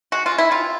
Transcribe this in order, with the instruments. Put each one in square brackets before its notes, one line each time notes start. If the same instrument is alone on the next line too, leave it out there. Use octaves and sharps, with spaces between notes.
[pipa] G#3 F#4
F4
G#3
E4
C3 F4